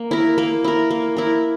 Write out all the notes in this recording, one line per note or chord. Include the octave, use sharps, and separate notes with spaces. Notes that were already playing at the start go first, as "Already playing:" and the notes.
Already playing: A#3
E4 A#4
A#3
E4 A#4
A#3
E4 A#4